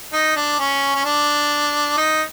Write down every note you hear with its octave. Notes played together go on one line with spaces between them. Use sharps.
D#4
D4
C#4
C#4
D4
D#4